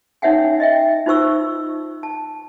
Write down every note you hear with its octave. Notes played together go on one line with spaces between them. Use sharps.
C#4 D#4 C#5 E5 F#5 G#5
D#5 E5 G5
D#4 F4 C5 C#6 E6
A5